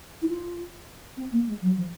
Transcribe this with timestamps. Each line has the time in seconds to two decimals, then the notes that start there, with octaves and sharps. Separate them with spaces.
0.22 E4
0.29 F4
1.17 C4
1.32 A#3
1.47 G#3
1.62 F#3
1.77 F3